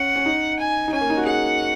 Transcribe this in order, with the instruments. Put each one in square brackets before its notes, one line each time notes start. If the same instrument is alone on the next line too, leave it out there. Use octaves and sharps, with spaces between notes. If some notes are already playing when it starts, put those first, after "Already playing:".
Already playing: [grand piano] C#4 [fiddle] F#5
[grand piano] C#4
D#4
[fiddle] G#5
[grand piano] D#4
[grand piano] C#4 [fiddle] G#5
[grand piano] A#3
D#4
F#4
[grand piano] G#4 [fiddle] F#5